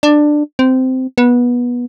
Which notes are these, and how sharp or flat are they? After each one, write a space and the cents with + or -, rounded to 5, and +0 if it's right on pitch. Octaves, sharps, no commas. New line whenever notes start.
D4 +15
C4 -15
B3 -20